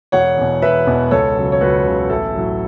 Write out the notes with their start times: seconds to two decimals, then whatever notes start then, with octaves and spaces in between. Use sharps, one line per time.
0.12 E1 C#5 F#5
0.37 E2 B2
0.62 E1 B4 E5
0.87 E2 B2
1.11 C#2 A4 C#5
1.37 C#3 F#3
1.52 C#5
1.61 C#2 F#4 B4
1.85 C#3 F#3
2.10 A1 E4 A4
2.35 A2 F#3